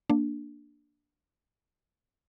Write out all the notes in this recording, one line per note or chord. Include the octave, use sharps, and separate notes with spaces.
A#3 D4